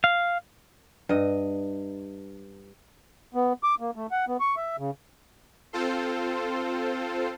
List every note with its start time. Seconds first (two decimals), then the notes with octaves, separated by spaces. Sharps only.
0.04 F5
1.09 G2 D#5
3.35 B3
3.63 D6
3.80 A#3
3.96 A3
4.11 F#5
4.28 B3
4.40 C#6
4.57 E5
4.78 C#3
5.73 C4 F4 A4 C5